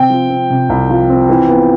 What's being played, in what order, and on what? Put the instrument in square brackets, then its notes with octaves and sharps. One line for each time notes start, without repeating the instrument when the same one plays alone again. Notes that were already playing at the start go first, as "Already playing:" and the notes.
Already playing: [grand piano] C3 C4 [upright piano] G5
[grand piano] F3
C4
C3
C2
F3
C4
E3
B3